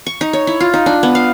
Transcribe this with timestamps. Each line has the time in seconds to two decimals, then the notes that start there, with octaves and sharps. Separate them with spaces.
0.07 C#6
0.21 D#4
0.33 C#5
0.47 E4
0.60 F4
0.74 D#4
0.86 D4
1.03 B3
1.15 F5